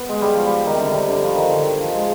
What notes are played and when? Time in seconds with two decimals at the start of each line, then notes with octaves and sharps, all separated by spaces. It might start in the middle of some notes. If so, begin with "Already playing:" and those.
Already playing: B3
0.09 G#3
0.21 G3
0.34 F3
0.46 G3
0.66 D#3
0.75 C3
0.81 D3
0.94 C3
1.08 D3
1.23 F3
1.36 D#3
1.49 D3
1.62 D#3
1.80 F3
1.94 G#3